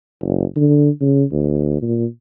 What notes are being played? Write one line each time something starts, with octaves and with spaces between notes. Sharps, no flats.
F#1
D3
C#3
D2
A#2